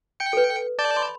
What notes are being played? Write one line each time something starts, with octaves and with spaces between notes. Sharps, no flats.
G5 C#7
A4 B4
D5 A5 G6
B5 C6